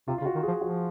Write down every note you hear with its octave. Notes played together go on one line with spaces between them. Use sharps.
C3 F4
F4
C#3
F#4
D#3
F3 G#4
F3 F#4